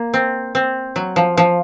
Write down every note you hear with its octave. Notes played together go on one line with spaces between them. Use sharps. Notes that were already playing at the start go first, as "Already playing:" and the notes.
Already playing: A#3
C4
C4
F#3
F3
F3